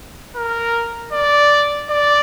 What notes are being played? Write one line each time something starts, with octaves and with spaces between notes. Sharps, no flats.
A#4
D5
D5